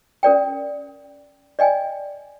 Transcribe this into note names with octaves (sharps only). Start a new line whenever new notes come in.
C#4 A#4 D5 G5
D5 D#5 G5 G#5